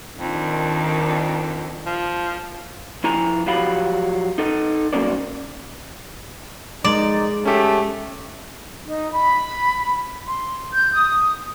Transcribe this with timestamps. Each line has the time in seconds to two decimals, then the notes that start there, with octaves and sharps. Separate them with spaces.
0.18 F2 D#3 D4
1.86 F3
3.04 F3 E4 G#5 A#5
3.46 F3 F#3 G4 F5 F#5 B5
4.38 D#4 A4 D#5
4.93 C2 F#3 A#3 C#4 C5 D5
6.84 G#3 D#4 D5
7.45 A3 C#4 G4
8.86 D#4
9.12 B5
10.28 C6
10.73 G6
10.93 D#6